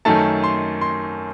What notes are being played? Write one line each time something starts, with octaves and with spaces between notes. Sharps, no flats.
F#2 D#3 A3 A5
C6
C6